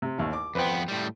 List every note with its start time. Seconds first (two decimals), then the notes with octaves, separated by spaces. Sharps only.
0.02 C3
0.18 A1 D#2
0.33 D6
0.55 F2 B3 B4 C5 G5
0.88 A2 G3